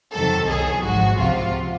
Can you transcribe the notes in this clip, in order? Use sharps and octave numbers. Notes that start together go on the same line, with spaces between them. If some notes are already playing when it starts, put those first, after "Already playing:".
F2 C3 D#3 F#3 A4
C2 B2 F#3 G#4
G#1 G#2 F3 F#4
C#2 C3 F3 F4